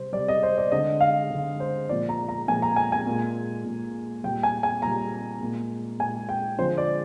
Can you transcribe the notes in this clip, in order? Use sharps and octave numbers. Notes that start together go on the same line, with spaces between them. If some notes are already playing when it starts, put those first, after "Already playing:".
Already playing: C3 G3 C5
C3 G3 D5
D#5
C5
D5
D3 G#3 D#5
F5
D3 G#3
C5
A#2 F3 G#3 D5
A#5
A#5
A#2 F3 G#3 G#5
A#5
G#5
G#5
A#2 G#3
A#2 G#3
A#2 G3 G5
G#5
G#5
A#2 G3 A#5
A#2 G#3
A#2 G#3 G#5
G5
D3 F3 G#3 C5
D5